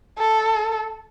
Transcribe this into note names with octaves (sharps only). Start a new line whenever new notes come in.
A4